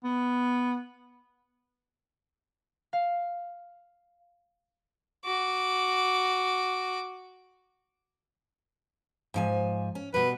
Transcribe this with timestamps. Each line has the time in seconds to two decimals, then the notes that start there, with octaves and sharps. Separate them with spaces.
0.04 B3
2.93 F5
5.25 F#4 D6
9.34 G#2 F3 G#5
9.95 C#4
10.14 B2 G3 B4